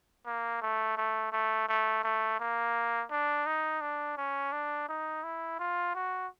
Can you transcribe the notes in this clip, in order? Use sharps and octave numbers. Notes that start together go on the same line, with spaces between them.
A#3
A3
A3
A3
A3
A3
A#3
D4
D#4
D4
C#4
D4
D#4
E4
F4
F#4